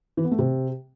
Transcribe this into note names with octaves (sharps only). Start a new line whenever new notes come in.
E3
B3
A3
C3